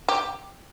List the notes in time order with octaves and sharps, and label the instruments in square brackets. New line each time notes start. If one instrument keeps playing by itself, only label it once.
[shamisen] G4